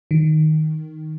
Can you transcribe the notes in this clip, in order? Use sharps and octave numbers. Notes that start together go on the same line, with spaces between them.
D#3